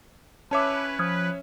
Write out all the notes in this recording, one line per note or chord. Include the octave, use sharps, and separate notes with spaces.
C#4 E4 B4 C#5 E5 A5 D6
F3 B4 D#6 F6 G#6